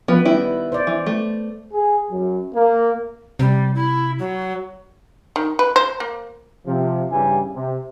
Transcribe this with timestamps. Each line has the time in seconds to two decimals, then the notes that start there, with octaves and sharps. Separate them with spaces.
0.08 F3 B3 B4
0.25 D#3 G3 E4
0.72 C5 D5
0.87 E3
1.06 A3
1.73 G#4
2.11 F#2
2.54 A#3
3.39 C3 G3
3.75 E4
4.19 F#3
5.36 D#3
5.59 B4
5.76 C5
6.00 A#3
6.66 C3 F3
7.11 G2 C#3 E3 G3 G4 G#5
7.55 C3